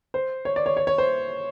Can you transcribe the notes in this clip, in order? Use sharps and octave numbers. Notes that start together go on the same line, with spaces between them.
C5
C#5
D5
C#5
C#5
C#5
C5